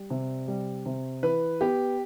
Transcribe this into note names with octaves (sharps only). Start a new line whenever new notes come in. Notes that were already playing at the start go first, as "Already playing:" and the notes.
Already playing: G3
C3
G3
C3
E3 B4
B3 G4